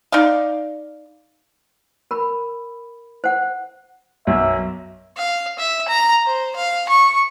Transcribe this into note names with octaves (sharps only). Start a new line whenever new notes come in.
D#4 D5 F5
A#4 B5
C5 F#5
B1 F#2 E5
F5
E5
A#5
C5
F5
C#6